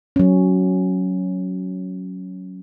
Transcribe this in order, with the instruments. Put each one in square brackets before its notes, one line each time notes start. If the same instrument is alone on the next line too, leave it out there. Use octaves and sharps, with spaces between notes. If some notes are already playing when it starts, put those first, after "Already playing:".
[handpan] F#3 C#4